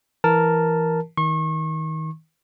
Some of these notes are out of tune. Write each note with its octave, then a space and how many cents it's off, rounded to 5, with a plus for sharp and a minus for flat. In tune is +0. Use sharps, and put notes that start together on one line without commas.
E3 +5 A#4 +0 A5 +0
D#3 +30 C#6 -35